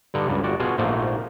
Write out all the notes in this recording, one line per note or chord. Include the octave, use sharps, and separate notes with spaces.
G2 D3 D#4
C#2 G2
G1 F#4 D5
B2 F4 F#4 G#4
A#1 G#2 F3 A3 A#3